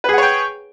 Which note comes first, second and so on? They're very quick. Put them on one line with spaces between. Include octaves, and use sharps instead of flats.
B4 G#4 F#5 C#5 G5